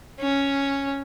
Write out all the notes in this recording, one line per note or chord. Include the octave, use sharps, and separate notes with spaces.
C#4